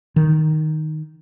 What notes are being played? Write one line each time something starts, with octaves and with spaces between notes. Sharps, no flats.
D#3